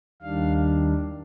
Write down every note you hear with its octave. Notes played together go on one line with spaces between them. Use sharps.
D#2 D#3 G3 D4 F5